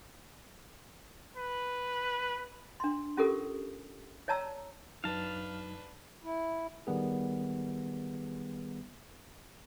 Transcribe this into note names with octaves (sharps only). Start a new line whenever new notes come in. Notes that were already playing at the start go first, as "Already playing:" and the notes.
B4
D4 C6
C#4 F4 G4 A4 A#4 D#6
C#5 D5 A5 A#5 E6
F#2 F#3 D4 D#4 B4 F5 A5
E4
D#3 G3 B3 G#4